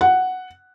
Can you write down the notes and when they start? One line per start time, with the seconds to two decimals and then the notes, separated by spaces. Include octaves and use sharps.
0.01 F#5